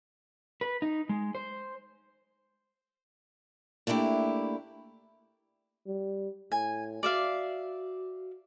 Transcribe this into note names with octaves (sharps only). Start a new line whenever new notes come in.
B4
D#4
G#3
C5
A3 A#3 D4 E4 G4
G3
A2 G#5
F#4 D5 E5 F5